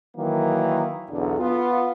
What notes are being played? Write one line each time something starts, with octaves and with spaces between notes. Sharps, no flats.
D#3 E3 F#3 A#3
B1 E2 D3
B3 F4